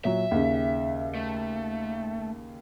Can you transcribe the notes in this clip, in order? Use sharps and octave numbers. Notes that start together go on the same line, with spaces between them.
A#2 F#3 E5
D#2 C#3
A3